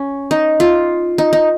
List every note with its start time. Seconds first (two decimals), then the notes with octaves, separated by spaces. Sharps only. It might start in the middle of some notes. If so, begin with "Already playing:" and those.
Already playing: C#4
0.31 D#4
0.60 F4
1.18 D#4
1.33 D#4